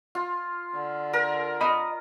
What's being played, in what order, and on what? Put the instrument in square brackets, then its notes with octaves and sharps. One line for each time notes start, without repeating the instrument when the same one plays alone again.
[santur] F4
[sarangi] D3
[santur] A#4
[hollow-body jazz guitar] D#5 B5